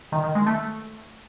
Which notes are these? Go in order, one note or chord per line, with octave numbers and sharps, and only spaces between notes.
D#3
D#3
G#3
A3